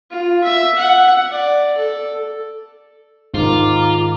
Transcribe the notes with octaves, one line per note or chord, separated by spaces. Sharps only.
F4
E5
F#5
D5
A4
G#2 D#3 F4 A#5 D6